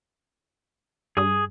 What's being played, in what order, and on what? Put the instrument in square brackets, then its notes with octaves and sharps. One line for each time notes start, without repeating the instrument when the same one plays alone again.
[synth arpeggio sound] G2 [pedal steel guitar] G#4 D#6